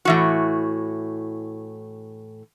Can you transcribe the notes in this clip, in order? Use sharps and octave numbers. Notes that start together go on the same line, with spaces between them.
A2 E3 F#4